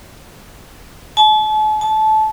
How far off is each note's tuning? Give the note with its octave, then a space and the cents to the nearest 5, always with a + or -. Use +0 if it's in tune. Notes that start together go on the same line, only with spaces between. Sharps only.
A5 -40
A5 -20